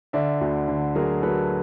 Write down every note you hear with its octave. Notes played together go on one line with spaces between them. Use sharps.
D3 D5 E5
D2
D3
F#3 G#4 A#4
F#3 A4 B4